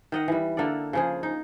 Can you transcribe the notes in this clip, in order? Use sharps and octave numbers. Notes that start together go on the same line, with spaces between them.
D#3 D#5 F#5
E3 G3
D3 A#3 A4 D5
C#3 F3 G#4
D#4